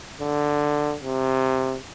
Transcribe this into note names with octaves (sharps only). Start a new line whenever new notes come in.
D3
C3